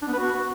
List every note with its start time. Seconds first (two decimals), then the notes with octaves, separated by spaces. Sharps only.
0.02 D4
0.08 B3
0.13 B4
0.19 F#4